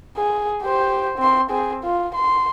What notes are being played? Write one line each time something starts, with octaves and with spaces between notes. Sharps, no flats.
G#4
G4 C5
C4 C6
C4 G#4
F4
C6